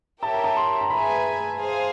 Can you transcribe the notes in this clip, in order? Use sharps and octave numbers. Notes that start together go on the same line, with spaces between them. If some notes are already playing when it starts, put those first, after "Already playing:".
G4 A#4 C#5 E5 G5 A5
A#5
A5
C6
A#5
G#4 B4 E5 G#5 B5
G#4 C5 F5 G#5